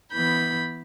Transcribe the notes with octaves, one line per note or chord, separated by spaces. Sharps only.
E3 B3 B5 G6